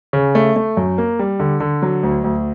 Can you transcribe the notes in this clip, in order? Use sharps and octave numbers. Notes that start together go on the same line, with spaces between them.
C#3
A3
A3
F#2
A#3
G3
D3
D3
F#3
D2
D2